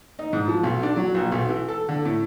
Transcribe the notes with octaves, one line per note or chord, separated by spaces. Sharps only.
D#4
G#2
F3
B1
D4
F#3
A#1
B1
E3
A4
D3
A2